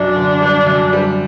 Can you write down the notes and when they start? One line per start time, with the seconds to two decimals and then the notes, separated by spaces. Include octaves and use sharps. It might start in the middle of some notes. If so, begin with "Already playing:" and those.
Already playing: F#2 D4
0.16 D3
0.41 G3
0.67 F#2
0.93 G3